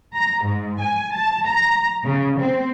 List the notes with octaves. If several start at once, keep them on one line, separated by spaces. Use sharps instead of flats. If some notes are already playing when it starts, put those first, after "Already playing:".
A#5
G#2
G#5
A5
A#5
C#3
C4